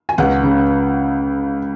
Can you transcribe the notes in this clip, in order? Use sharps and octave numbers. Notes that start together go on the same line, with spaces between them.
G#5
C#2 F#5
C#3